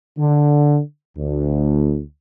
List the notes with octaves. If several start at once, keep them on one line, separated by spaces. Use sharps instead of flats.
D3
D2